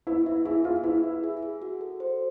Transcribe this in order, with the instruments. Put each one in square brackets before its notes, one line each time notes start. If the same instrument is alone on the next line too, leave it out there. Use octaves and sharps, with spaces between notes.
[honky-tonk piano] E4 [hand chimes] B4
[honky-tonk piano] E4 [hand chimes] E5
[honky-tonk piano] E4 [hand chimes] G#4
[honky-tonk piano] F4 [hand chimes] G#4
[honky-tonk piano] E4 [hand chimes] B4
[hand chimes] E5
G#4
G#4
F#4
A4
C5